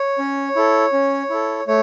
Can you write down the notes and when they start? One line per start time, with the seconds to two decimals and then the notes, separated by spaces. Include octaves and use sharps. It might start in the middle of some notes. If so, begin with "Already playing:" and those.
Already playing: C#5
0.18 C#4
0.56 E4 A4
0.93 C#4
1.30 E4 A4
1.67 A3 C#5